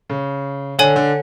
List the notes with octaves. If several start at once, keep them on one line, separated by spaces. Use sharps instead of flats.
C#3
D3 A4 C#5 G#5
D3